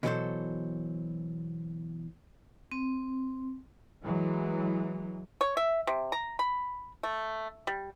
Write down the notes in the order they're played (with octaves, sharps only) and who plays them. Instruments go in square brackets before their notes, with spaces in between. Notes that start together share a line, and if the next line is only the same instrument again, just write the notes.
[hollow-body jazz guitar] B2 E3 F#3 F4 A4 C5
[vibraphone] C4
[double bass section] E3 F#3 G#3
[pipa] C#5
E5
C3
A#5
B5
A3
G3